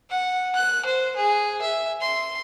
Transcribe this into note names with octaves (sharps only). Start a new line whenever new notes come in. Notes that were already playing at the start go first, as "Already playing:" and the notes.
F#5
F#6
C5
G#4
E5
C6